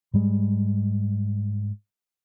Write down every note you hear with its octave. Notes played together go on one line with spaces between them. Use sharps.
G#2 G3 G#3